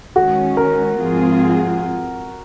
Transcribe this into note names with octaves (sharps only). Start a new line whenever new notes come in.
D#3 G#3 C#4 F#4
A#4
G#2 F3 C4 F4 G#4